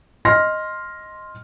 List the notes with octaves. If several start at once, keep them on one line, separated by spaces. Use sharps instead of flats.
D#5 C6 F6 A#6